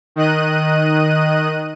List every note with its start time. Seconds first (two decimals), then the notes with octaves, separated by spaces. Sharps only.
0.16 D#3 D#5 F#6 D#7